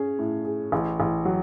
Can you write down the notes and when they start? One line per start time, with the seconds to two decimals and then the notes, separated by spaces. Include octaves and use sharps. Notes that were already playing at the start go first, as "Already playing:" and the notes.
Already playing: C#4 G#4
0.19 A2
0.45 G#4
0.72 A1
1.00 A1
1.25 F#3